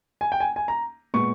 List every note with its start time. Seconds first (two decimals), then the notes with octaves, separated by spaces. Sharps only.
0.21 G#5
0.32 G5
0.40 G#5
0.56 G#5
0.68 A#5
1.14 A#2 G#3 B3 C#6